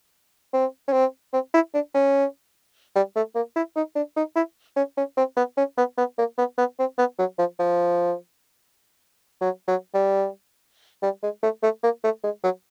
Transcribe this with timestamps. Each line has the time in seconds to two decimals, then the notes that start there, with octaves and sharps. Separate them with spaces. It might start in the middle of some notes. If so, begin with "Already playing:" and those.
0.53 C4
0.88 C#4
0.93 C4
1.33 C4
1.54 E4
1.74 D4
1.94 C#4
2.95 G3
3.16 A3
3.35 A#3
3.56 E4
3.76 D#4
3.95 D4
4.16 D#4
4.36 E4
4.76 C#4
4.97 C#4
5.17 C4
5.36 B3
5.57 C#4
5.77 B3
5.97 B3
6.18 A#3
6.38 B3
6.58 B3
6.79 C4
6.98 B3
7.19 F#3
7.38 F3
7.59 F3
9.41 F#3
9.67 F#3
9.94 G3
11.02 G3
11.23 G#3
11.43 A3
11.63 A3
11.83 A#3
12.03 A3
12.23 G#3
12.43 F#3